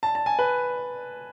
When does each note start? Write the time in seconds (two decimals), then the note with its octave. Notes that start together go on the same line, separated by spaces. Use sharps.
0.03 A5
0.15 A5
0.26 G#5
0.39 B4